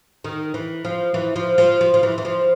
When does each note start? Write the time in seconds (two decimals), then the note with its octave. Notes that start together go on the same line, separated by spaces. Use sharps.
0.24 D#3
0.54 E3
0.85 F3
1.14 E3
1.36 F3
1.58 F3
1.81 F3
1.94 F3
2.03 E3
2.18 E3
2.25 F3